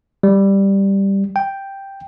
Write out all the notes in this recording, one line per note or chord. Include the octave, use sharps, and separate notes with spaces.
G3
G5